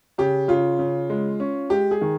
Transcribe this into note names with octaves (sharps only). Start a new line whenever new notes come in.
C#3 G4
C#3 F4
C#3
G#3
C#4
G#3 G4
G#4
D#3